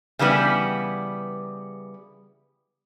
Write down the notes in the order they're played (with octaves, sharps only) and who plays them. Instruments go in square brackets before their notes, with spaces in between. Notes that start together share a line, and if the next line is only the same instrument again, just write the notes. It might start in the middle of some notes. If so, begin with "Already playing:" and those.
[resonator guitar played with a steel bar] C#3 E3 G3 B3